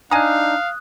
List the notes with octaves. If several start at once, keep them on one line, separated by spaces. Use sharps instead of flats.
D4 D#4 F5 G#5 A#5 D#6 F#6